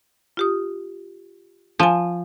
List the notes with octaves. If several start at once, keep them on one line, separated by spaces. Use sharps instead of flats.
F4 G4 D#6
F3 F5 G#5